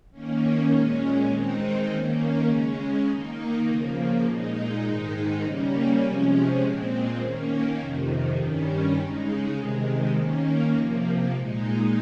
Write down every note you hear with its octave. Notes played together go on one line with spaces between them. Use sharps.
D#3 A#3 C#4
A#2 G#3 C#4
D#3 G#3 C4 D#4
D#3 A#3 C#4
C#3 G#3 C#4
D#3 A#3 D#4
C#3 F3 A#3
A#2 G#3 D#4
G#2 D#3 G#3 D#4
C#3 G3 A#3 C#4
C3 F3 G#3 C#4
A#2 G#3 C4
D#3 A#3 C#4
F2 C3 D#3
G2 D#3 G3 C#4
C#3 G#3 D#4
C3 D#3 G#3
D#3 A#3 C#4
C3 F3 A#3
A#2 G#3 D#4